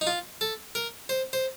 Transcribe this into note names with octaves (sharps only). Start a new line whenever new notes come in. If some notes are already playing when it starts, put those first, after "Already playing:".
D#4
F4
A4
A#4
C5
C5